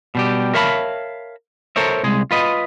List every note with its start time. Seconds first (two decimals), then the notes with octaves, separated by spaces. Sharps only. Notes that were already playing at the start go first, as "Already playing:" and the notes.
0.15 B2 G3 G4
0.54 A#4 C#5 E5 F5 A5 B5
1.76 A4 A#4 C5 C#5 E5
2.03 C2 G#3 G#4
2.31 F4 B4 D#5